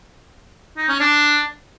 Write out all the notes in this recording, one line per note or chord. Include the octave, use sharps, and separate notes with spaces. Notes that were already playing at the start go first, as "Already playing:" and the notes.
D#4
C#4
D4